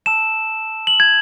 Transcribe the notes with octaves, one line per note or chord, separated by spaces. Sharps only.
A5 E6 E7
F#7
G#6